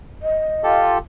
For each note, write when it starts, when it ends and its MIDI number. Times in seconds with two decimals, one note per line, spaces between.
0.22 0.78 75
0.64 0.98 65
0.64 0.98 67
0.64 0.98 69